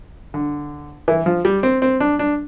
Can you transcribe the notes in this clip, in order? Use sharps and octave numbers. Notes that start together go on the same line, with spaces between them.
D3
E3
F3
G3
C4
C4
D4
D4